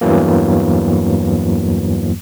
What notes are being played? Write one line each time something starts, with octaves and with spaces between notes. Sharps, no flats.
E2 G2 E3 F#3 A#3